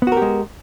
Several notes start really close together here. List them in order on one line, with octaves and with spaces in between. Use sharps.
B3 F#4 A#4 G4 G#3